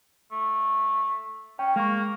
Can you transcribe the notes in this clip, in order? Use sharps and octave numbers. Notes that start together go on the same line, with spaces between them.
A3
C#4 G5
G#3 A#3 C#6